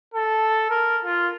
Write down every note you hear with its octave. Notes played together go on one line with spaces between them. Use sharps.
A4
A#4
F4